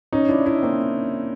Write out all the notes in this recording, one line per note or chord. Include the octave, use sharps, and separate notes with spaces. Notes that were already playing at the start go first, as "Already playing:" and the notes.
C#4 D#4
D4 E4
D4 E4
A#3 C4